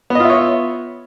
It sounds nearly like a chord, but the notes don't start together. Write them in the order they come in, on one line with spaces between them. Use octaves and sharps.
B3 D#5 F4 E5 C#5